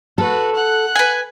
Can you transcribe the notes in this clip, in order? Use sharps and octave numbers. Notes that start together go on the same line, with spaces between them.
F#4 A4 B4
F#5 F#6
B4 G#5